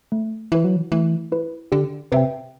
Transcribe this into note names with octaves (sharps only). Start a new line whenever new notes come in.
A3
E3 E4 B4
F#3
E3
E3 A3
E4 B4
D3 G4
C3 B4 E5 G5